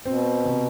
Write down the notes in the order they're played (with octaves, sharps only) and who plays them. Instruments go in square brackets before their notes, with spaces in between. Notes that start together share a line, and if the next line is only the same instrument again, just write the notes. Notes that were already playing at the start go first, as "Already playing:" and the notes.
[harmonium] B2 [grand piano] C4
[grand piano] C3